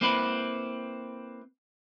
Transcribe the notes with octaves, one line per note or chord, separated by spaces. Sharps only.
A#3 C4 E4 B4